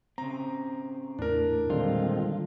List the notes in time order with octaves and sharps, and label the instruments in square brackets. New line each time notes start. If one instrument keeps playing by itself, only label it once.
[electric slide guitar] C#3 C4 [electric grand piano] A#5
[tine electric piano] E2 [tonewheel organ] A2 [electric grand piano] D4 A#4
[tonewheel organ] A#2 G#3 C4 [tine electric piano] D3 D#3 G3 [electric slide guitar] F4